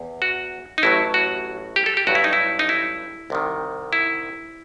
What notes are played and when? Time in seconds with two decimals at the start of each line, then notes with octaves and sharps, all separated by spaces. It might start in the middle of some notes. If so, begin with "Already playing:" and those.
Already playing: E2
0.22 F#4
0.78 D#4
0.83 A1 A2 F#3 E4
1.14 F#4
1.76 G4
1.86 A4
1.97 G4
2.07 A1 G2 F#3 F#4
2.15 E4
2.24 D#4
2.33 E4
2.59 D#4
2.69 E4
3.30 C2 C3 D#3
3.93 E4